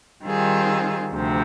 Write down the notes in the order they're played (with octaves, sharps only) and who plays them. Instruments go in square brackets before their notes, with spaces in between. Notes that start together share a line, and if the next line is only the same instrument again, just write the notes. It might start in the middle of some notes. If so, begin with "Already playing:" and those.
[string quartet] D#3 G3 C4 F4 G#4
D2 C3 F3